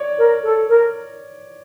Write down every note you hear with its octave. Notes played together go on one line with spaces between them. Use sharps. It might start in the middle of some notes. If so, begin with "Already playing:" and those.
Already playing: C#5 D5
A#4
A4
A#4